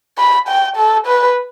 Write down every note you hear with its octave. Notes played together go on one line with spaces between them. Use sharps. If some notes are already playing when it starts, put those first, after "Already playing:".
B5
G5
A4
B4